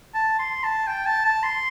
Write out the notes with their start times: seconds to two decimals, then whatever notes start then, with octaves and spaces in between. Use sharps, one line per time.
0.14 A5
0.39 C6
0.63 A5
0.87 G5
1.06 A5
1.25 A5
1.43 C6